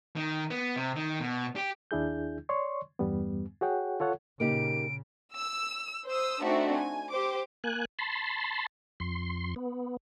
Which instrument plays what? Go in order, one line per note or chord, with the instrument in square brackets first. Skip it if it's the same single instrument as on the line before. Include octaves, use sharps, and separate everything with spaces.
[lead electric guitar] D#3
B3
C3
D#3
B2
G4
[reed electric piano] D#2 D4 E4 G#4 G6
C#5 D5 C6 C#6
E2 G2 G3 B3
F#4 G#4 C#5 F#5 G5
F4 A4 C#5 F#5
[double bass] A#2 C#3 [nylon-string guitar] A#3 D#4 G4 [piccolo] D7
[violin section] E6
C5 D#6 E6
A3 C4 D4 D#4 F#4 E5
G#5
G4 C5 D6
[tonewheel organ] A#3 G#5 F#6
A5 B5 C6
F2 C6
B3